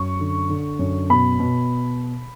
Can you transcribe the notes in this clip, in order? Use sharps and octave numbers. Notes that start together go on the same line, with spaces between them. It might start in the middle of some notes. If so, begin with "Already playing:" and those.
Already playing: F#2 C#6
D3
D3
F#2
B2 B5
B2